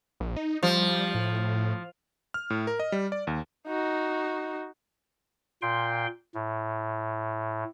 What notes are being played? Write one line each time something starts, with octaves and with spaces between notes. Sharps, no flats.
A#1
D#4
F3 G3
A2
F6
A2
A#4
D#5
G3
D5
D#2
D#4 F#4
A#2 G5 C6
A2